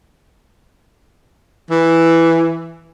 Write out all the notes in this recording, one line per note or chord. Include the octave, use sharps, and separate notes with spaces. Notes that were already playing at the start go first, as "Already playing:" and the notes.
E3